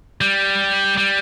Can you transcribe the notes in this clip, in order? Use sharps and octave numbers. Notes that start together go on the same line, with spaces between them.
G3
G3